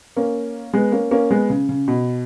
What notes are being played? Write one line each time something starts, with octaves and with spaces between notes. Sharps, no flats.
A#3 C#4
G#3 B3
A#3 C#4
A#3 C#4
G#3 B3
C#3
C#3
B2